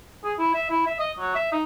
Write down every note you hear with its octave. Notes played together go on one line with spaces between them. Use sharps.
G#4
E4
E5
E4
E5
D#5
F#3
E5
D#4